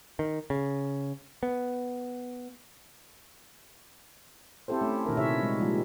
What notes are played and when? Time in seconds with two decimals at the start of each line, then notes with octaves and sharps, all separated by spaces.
0.19 D#3
0.50 C#3
1.43 B3
4.68 C4 E4 G4 A4 C5
4.81 A3 C#4
5.06 A#2 D#3 D4 A#4
5.17 C3 E4 C#5 E5
5.42 G3 G#3 D#4
5.60 F3 G3 G#3 A#3